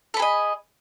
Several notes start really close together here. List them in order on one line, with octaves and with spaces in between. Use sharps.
A4 B5 G#4 D#5